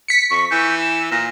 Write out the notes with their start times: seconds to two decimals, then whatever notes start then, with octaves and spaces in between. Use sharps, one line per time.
0.08 B6 C#7
0.31 F2 C#6
0.51 E3 G6
0.81 E7
1.11 A#2 A#6